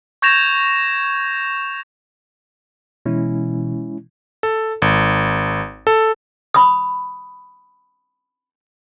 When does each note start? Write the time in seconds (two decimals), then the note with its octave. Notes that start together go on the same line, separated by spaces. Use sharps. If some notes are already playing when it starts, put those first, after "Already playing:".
0.22 C#6 G6 G#6 A#6 E7 F7
3.06 B2 E3 G#3 C#4 E4
4.43 A4
4.82 G#1
5.87 A4
6.54 B5 D#6